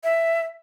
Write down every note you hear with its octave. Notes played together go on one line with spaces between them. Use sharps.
E5